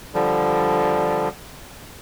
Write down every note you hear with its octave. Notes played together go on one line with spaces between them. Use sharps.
D3 F3 G3